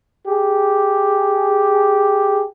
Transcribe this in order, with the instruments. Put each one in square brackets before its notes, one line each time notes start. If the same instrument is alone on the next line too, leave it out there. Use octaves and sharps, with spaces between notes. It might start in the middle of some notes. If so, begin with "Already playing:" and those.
[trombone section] G4 G#4